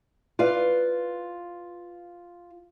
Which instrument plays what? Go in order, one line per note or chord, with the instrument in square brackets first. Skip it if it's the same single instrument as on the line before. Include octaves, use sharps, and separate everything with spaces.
[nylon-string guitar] F4 B4 D5 F5